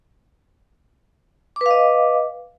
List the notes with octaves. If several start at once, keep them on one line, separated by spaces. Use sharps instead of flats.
B4 D#5 F5 D6